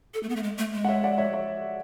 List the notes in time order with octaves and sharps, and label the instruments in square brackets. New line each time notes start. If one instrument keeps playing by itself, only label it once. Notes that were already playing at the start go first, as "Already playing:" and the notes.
[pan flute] A4
A3
B3
A3
G#3
A3
G#3
[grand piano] F#5
C#5 E5
D5 F#5
C#5 E5
C#5 E5